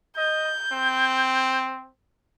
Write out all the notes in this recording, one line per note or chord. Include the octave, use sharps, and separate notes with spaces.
D#5 G6
C4